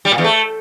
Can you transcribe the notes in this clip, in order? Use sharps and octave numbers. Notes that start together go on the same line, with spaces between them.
G3
A#2
E2
A3